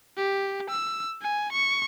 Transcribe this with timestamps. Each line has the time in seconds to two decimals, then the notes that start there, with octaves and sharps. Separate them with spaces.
0.17 G4
0.70 E6
1.22 G#5
1.52 C#6